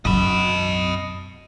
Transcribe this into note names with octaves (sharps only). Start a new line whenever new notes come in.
B1 F#2 D#5 B5